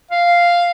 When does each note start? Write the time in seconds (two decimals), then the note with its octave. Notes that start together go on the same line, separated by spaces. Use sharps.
0.11 F5